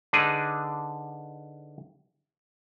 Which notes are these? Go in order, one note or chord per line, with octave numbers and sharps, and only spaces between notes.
D3 D4 D#4 G#4 B4